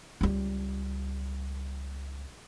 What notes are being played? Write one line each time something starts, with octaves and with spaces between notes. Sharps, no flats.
C#2 G3